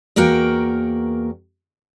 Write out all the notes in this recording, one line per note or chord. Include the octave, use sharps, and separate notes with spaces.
E2 A#3 F#4 A#4 G5